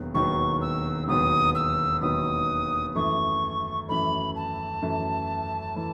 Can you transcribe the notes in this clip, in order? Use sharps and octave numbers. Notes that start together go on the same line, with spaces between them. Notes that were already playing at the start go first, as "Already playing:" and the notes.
Already playing: E1 D#2 D#3 F#3 B3
E1 D#2 D#3 F#3 B3 C#6
E6
E1 D#2 D#3 F#3 B3 D#6
E6
E1 D#2 D#3 F#3 B3 D#6
F#2 E3 A3 C#6
F#2 E3 A3 B5
A5
F#2 E3 A3
E3 A3